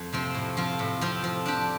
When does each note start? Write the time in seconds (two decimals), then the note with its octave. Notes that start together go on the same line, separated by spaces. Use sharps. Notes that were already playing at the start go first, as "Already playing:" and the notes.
Already playing: F2
0.13 C3 F3 C4
0.34 A2
0.57 F3 C4 F4
0.79 A2
1.01 F3 C4 F4
1.24 F3
1.46 D4 G4